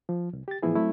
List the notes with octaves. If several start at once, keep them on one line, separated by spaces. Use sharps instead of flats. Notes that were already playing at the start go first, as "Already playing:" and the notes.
F3
C2
G4 A6
A2 E3 F3 B3 E4 G#4
F#3 A3 C4 E4